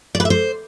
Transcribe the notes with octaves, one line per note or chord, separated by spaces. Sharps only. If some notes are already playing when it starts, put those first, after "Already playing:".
D5
B4
E5
C5